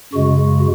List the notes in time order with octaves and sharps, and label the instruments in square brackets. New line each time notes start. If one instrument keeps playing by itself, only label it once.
[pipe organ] F#2 C#3 G#3 F#4